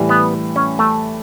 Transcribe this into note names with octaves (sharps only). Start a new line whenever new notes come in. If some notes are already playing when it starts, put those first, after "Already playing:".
Already playing: A2 E3 G3
B3
C#4
A3